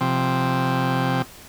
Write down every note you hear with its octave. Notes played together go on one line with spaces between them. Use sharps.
C3 F3 C4